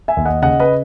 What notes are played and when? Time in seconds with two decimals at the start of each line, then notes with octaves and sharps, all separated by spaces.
0.08 E5 G#5
0.17 D#2
0.25 D#5 F#5
0.42 C#3 D#5 F#5
0.60 B4 D#5